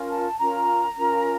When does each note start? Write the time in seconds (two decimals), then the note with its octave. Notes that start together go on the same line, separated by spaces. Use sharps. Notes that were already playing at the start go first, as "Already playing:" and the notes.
Already playing: C#4 F4 A#4
0.10 A5
0.39 C#4 F4 A#4 A#5
0.98 C#4 F4 A#4